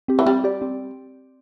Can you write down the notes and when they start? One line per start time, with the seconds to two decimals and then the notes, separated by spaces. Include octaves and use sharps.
0.08 C4 G4
0.19 E3
0.26 G3 C4
0.44 G4 D5
0.62 C4